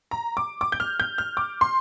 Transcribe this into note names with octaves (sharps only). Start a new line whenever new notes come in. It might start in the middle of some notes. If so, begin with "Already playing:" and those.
A#5
D6
D6
G6
F6
G6
F6
D6
C6